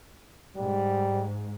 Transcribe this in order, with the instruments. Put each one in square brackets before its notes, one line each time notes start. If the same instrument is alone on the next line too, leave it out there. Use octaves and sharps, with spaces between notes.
[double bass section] G#2 [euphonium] G3